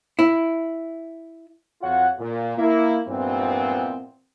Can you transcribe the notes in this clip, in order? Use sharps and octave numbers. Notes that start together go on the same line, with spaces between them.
E4
F2 F4 F#4 C#5 F#5
A#2
A#3 E4
G2 A#2 E3 F3 B3 C4